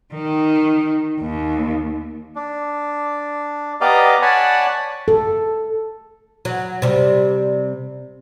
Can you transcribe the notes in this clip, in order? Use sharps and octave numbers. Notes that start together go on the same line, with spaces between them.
D#3
D#2
D4
B3 G4 D5 D#5 F5 A#5
C#5 D5 F#5 G#5 A5 B5
A4
F#3
C3 G3